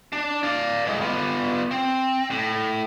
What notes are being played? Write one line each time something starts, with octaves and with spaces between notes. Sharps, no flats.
D4
D5 F5
A2 G#3
B3 F4
C4
A2